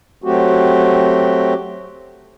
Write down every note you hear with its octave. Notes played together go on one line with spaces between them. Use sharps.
F#3 A3 C4 F#4 G4